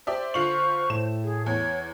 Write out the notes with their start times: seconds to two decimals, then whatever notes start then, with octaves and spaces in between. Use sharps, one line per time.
0.07 G4 C5 D5 E5
0.34 D3 F4 C#6 F#7
0.90 A2 E7
1.24 G#4
1.46 E2 C#5